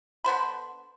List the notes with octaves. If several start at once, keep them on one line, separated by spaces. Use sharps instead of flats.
D3 B3 C5 B5